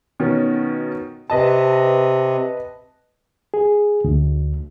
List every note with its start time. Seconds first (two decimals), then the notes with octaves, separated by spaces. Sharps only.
0.20 B2 D#3 C#4
1.30 C3 B4 D#5 A5
3.54 G#4
4.04 D2